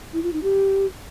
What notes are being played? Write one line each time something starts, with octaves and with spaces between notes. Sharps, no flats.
E4
F4
D#4
G4